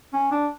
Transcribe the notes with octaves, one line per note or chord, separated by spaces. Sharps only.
C#4
D4